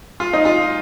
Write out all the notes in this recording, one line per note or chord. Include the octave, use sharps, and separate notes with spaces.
F4
D#4
F4